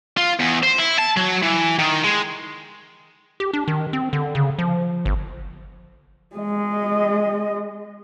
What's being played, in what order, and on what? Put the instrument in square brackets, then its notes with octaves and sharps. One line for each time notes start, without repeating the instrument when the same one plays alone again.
[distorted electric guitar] F4
E2
C5
E4
A5
F#3
E3
D#3
G#3
[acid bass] G4
D4
D#3
C4
D3
C#3
F3
G1
[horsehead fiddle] G#3 D#5